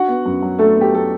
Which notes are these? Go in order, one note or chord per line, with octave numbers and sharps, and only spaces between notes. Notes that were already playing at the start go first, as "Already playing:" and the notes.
Already playing: D4 F#4 F#5
B3
F#2
F#3
A3 D4 A4
B3
G4
F#3 A4